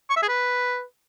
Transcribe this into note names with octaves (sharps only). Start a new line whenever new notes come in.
C#6
E5
G#4
B4